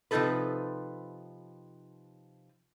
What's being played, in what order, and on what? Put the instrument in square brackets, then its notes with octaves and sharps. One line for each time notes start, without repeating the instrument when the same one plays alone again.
[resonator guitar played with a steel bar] C3 F3 F#3 D#4 A4 B4